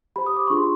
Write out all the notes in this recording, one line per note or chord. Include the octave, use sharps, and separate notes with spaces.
G4 C5 B5
D#6
D6
D4 F4 G#4 C#6
C6